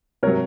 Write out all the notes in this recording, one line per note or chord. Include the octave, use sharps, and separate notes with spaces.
C3 F#3 A#4 C#5